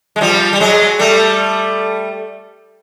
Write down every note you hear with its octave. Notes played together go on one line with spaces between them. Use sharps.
G#3
F3 G3
G3
F#3 G#3
G3 A3